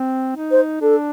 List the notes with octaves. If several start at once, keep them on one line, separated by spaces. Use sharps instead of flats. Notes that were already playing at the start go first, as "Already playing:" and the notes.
Already playing: C4
D#4
C5
D4 A4